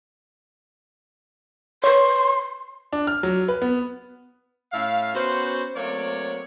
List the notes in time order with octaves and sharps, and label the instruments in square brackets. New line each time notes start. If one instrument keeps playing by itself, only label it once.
[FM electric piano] B4 C#5 [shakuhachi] C6
[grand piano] D4
F6
F#3
B4
B3
[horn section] A2 C#4 E5 F5
B3 C#4 F#4 C5
F#3 A3 A#3 C4 C#5 D5